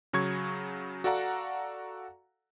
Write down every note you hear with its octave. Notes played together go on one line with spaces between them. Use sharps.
C#3 F#3 C#6 G#6
F#4 A4 D5 F5 F#5 A#5